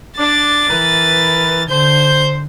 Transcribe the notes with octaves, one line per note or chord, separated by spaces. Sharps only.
D4 A6
E3 A#4 B4
D3 C5 G6